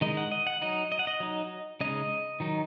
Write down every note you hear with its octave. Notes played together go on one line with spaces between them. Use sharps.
D#3 G#3 D#4 D#5
F#5
D#5
F#5
F#3 D#4 D#5
D#5
F#5
D#5
F#3 D#4
C#3 G#3 D#4 D#5
D#3 F#3 D#4